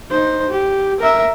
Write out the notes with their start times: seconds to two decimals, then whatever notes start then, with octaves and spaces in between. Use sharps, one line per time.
0.11 D#4 C5
0.50 G4
1.00 A#4 E5